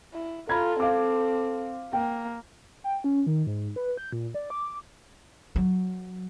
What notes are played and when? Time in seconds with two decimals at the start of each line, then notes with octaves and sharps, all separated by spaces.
0.14 E4
0.49 F4 A4 A#5 B5 G#6
0.80 C4 F5 D6
1.93 A#3 G5
2.84 G5
3.04 C#4
3.26 D#3
3.47 G#2
3.76 B4
3.97 G6
4.12 A#2
4.34 D5
4.50 D6
5.56 F#3